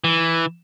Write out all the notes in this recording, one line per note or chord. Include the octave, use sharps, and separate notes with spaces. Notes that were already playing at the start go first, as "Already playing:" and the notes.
E3